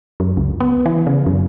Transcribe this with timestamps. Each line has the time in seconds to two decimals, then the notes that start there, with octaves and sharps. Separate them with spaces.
0.20 F#2
0.37 C#2
0.60 B3
0.86 E3
1.07 C#3
1.26 F#2